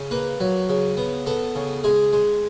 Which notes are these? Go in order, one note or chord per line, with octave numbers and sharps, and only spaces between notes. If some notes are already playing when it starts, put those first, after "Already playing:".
Already playing: C#3
A#3 B4
F#3
C#3
B3
B3 A4
C#3
G#3 G#4
G#3